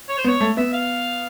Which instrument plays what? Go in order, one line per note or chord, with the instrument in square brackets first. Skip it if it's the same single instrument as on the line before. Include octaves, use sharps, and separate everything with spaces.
[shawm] C#5
C5
[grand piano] B3
[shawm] C#5
[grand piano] A3
[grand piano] B3 [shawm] E5
[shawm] F5